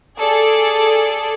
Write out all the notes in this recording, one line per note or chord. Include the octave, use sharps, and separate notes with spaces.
G#4 A4 D5